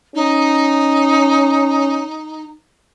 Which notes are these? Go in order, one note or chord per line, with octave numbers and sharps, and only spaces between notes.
C#4 D#4